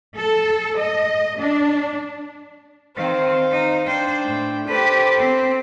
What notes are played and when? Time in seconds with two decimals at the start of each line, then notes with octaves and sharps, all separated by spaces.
0.17 A4
0.77 D#5
1.40 D4
2.96 D#3 C4 C5 F5
3.51 D#4
3.86 D4 C5 G5
4.24 A2
4.68 G4 A4 B4 C5
5.18 C4